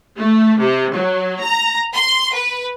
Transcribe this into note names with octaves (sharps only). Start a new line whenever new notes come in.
A3
C3
F#3
A#5
C6
B4